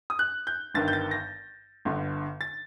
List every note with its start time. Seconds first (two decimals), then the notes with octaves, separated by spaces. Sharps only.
0.10 D#6
0.19 F#6
0.47 G6
0.74 G1 G2 D#3 A6
0.88 G6
0.93 A6
1.11 A#6
1.85 G1 G2 D3
2.41 A6